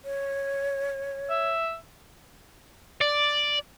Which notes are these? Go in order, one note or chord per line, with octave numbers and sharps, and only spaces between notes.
C#5
E5
D5